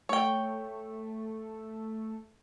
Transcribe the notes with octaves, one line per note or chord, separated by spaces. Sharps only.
A3 C#5 G5